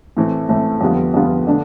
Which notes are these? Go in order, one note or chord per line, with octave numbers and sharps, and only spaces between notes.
A2 E3 A3 C4
A2 E3 A3 C4
F2 D3 G3 B3 F4
F2 D3 G3 B3 F4
D3 A3 D4